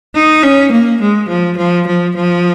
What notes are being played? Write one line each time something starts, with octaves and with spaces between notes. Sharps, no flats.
D#4
C#4
A#3
G#3
F3
F3
F3
F3